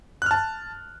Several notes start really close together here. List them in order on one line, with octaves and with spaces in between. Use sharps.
F#6 F6 A5